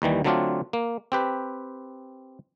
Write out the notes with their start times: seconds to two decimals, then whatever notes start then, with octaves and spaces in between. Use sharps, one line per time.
0.02 D#2 D#3 E3 G3
0.24 D3 F#3 A3 C4 D4 F4
0.73 A#3
1.12 C4 G4 B4